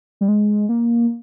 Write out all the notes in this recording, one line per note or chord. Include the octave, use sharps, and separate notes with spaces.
G3
G#3
A#3